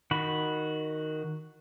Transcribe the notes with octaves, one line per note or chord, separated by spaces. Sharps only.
D#3 F#4 B5